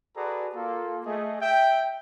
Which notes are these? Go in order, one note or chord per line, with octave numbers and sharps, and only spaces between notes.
F#4 G#4 A4 B4 D5 A#5
A#3 F4 A4
A3 G#4 D#5
E5 G5